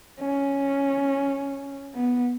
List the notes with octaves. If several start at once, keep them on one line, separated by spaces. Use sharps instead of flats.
C#4
B3